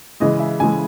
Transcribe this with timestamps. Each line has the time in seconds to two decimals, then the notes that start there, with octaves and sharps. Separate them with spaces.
0.20 C#3 E3 G#3 D#5
0.40 E5
0.60 C#3 E3 G#3 G#5